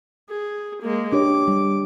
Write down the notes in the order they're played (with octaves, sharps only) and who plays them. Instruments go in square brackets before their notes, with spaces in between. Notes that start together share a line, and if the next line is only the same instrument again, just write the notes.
[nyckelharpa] G#4
G#3 A#3
[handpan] D4 G4 C#5 [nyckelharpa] D6
[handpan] G3